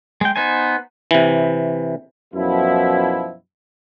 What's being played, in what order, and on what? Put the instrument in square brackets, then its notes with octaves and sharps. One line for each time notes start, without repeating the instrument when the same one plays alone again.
[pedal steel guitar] G#3 G5
B3 D#4 C5 G#5
[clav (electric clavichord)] C3 E3
[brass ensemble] F#2 B2 F3 E4